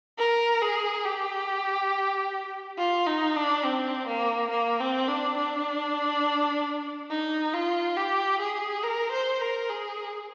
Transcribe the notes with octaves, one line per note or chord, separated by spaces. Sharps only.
A#4
G#4
G4
F4
D#4
D4
C4
A#3
A#3
C4
D4
D4
D#4
F4
G4
G#4
A#4
C5
A#4
G#4